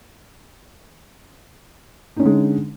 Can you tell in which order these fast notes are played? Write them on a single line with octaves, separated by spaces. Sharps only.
D#4 C#4 D3 G#3